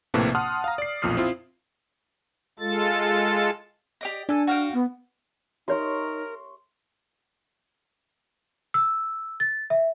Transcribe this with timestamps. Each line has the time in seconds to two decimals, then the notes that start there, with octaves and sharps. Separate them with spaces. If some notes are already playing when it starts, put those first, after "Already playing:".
0.14 A#1 A2 C3 A#3 B4 A5
0.35 F#5 A5 C6 D#6 F6
0.64 F5 A#5
0.78 D5 C7
1.02 B1 F2 A#2 D#6 F6 C7
1.17 C4 E4 F4
2.59 G#3 F4 A4 A6
4.01 G4 D5 D#5
4.29 D4 A4 G#5
4.47 F#4 F5 G5
4.73 B3
5.68 D#4 G4 A#4 C#5 C6 C#6
8.74 E6
9.40 A6
9.70 E5